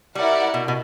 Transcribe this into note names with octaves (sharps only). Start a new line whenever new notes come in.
G3 E4 A#4 D5 F#5
B2
B2